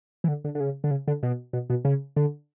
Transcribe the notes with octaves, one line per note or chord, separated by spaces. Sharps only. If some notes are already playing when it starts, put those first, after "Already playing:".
E3
D3
D3
D3
C#3
D3
C#3
D3
B2
B2
B2
C#3
D3